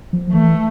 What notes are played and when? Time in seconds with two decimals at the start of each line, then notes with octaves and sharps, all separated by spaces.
0.13 F3
0.33 E3 A3